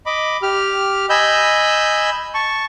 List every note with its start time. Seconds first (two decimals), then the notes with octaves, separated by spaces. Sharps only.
0.06 D#5 B5 D6
0.42 G4 F6
1.10 D#5 G#5 B5 E6 G6
2.34 A5 C#6